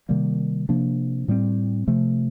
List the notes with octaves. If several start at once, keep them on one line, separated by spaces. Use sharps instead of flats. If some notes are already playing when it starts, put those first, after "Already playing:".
C3 D#3 G3 A#3
C3 F3 A#3 D4
A2 G3 C4
C3 F3 A3